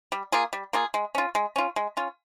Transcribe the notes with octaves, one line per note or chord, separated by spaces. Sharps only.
G3
A#3 F4 G#4
G3
A#3 F4 G#4
G#3
C#4 F4
G#3
C#4 F4
G#3
C#4 F4